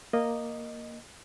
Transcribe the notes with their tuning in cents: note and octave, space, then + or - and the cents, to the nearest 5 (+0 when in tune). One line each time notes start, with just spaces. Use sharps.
A#3 +0 D#5 -10